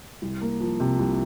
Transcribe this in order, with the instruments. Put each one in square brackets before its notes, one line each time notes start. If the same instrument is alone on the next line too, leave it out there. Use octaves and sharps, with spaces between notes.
[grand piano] C2
A#3
F3
C3
C2